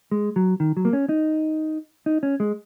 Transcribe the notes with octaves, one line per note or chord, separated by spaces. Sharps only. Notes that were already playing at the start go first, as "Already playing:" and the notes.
G#3
F#3
D#3
F#3
A#3
C#4
D#4
D#4
C#4
G#3